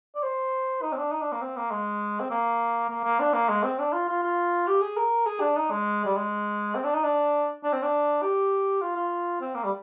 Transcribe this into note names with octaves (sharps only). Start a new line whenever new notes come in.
D5
C5
D#4
C4
D4
D#4
D4
A#3
C4
A#3
G#3
C4
A#3
A#3
A#3
D4
A#3
G#3
C4
D4
F4
F4
F4
G4
G#4
A#4
G#4
D4
D#4
G#3
G3
G#3
C4
D4
D#4
D4
D4
C4
D4
G4
F4
F4
C4
A#3
G3